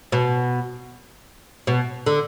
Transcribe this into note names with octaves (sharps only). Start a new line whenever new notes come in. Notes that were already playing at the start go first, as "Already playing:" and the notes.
B2
B2
D3